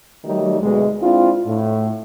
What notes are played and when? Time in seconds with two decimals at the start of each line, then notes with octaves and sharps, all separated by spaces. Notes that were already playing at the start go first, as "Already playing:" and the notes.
0.24 D#3 F#3 G3 A3 D#4
0.61 D2 B2 G#3
1.02 C4 D4 E4 F4
1.47 A2